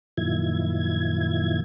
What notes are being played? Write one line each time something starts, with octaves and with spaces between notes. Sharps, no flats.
F#2 A#2 D#3 F3 E4 G#6